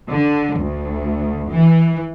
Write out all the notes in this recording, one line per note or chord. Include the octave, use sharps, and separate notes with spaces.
D3
D2
E3